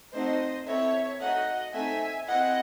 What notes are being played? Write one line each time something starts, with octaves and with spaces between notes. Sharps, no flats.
A3 C4 D#4 F#4 C5 D#5
C4 E4 A4 C#5 E5
A3 D#4 F#4 D#5 F#5
A3 C4 D#4 E5 G#5
C4 E4 G#4 D#5 F#5